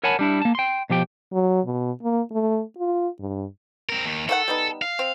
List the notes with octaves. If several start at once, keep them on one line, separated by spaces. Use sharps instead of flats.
A#4 C#5 F#5 G#5 A5 B5
G3 D4 E4
A#3 A5
G5 C6
B2 F3 G4 G5
F#3
B2
A#3
A3
F4
G2
C4 A#4
D#2 D#3
D#3 F#4 A4 F#5
G3 B3 D#4
F5
C4